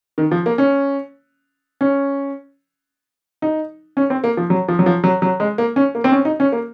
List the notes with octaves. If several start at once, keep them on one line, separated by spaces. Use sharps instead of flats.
D#3
F3
A#3
C#4
C#4
D#4
C#4
C4
A#3
F3
F#3
F3
F#3
F3
F#3
F#3
G#3
A#3
C#4
A#3
C4
C#4
D#4
C#4
A#3